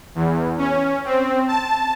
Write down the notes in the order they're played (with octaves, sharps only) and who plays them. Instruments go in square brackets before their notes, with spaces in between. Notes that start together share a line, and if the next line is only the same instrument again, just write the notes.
[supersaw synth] E2
C#4
C4
A5